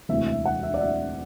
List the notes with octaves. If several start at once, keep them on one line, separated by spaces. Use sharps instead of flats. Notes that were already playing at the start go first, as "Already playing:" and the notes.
E1 D2 C3 E3 E5
E5
F#5
E5
D5
E5